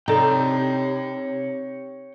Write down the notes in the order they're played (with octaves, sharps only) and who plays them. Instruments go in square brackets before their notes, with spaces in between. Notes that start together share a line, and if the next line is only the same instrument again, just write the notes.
[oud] C3 [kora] D#4 [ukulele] A4 D5 [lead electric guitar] C#5 G5